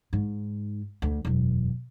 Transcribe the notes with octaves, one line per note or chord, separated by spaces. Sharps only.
G#2
D2
E1 F#2